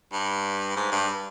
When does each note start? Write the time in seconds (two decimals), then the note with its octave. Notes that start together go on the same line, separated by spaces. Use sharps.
0.13 G2
0.76 G#2
0.92 G2